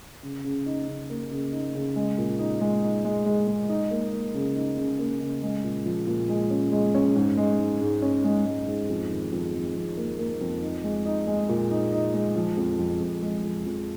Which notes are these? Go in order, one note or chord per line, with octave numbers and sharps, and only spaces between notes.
C#3
C#3
D#4
C#3
A#3
C#3
D#4
C#3
G#3
A#2
D#4
G#3
D#4
G#3
G#3
G#3
D#4
A#3
A#3
C#3
D#4
C#3
A#3
C#3
G#3
A#2
F3
A#2
G#3
C#4
G#3
C#4
G#2
G#3
G#2
G#2
C#4
G#3
G#3
G#2
F2
D#3
F2
F2
F2
A#3
A#3
F2
D#4
G#3
D#4
G#3
A#2
D#4
D#4
G#3
F3
F2
F2
F2
G#3
F2
F2